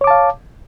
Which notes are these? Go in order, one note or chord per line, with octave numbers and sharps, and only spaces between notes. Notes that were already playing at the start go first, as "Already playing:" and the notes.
C#5 F5 A5 D6